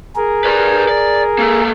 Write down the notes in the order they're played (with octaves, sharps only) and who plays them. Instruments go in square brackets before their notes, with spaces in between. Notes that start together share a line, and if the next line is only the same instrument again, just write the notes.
[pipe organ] G#4 A#4
[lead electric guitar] B4 D5
D5
A#3 A4